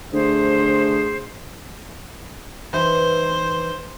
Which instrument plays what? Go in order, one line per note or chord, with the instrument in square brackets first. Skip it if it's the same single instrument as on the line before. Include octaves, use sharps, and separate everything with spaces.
[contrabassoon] D3 [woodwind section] A3 G#4 C5
[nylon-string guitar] E3 D#4 B4 [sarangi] C5